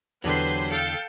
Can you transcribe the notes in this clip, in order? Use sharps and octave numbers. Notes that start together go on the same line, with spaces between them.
E2 D3 F#3 D4 G4 B4 C5 C6
A4 F5 G5